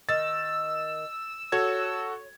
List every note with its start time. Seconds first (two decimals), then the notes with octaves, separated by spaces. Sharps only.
0.09 D#3 E6 A6
1.52 F#4 A4 C#5 G#6